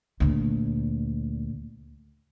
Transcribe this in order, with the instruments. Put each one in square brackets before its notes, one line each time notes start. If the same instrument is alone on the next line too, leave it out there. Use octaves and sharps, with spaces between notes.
[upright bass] D2 A#2